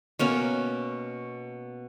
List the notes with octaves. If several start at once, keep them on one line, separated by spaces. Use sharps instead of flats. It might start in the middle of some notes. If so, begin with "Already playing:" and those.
B2 A#3 C#4